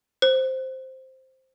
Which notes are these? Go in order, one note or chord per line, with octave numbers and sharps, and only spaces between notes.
C5